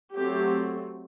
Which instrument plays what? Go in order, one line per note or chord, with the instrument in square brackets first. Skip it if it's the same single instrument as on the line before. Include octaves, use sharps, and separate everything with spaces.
[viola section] F#3 A3 C4 G4